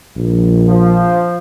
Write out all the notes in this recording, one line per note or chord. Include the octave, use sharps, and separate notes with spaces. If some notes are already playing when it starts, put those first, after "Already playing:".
A#1
F3